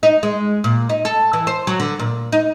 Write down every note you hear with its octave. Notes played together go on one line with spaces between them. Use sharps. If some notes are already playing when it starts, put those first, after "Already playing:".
D#4
G#3
A#2
D#4
A4
E3
C5
F#3
D3
A#2
D#4